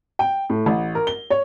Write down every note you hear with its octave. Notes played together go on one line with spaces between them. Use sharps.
G5
A2
A1
A#4
G7
C#5